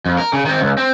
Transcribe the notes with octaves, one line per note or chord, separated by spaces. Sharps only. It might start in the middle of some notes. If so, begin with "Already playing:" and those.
F2
A#4
C#3
D#3 C4
C#2
C4